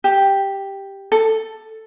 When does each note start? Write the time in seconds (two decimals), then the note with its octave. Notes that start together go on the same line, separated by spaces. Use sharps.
0.04 G4
1.12 A4